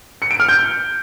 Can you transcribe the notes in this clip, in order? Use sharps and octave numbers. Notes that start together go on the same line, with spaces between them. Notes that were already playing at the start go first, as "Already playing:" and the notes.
C#7
D7
F6
G6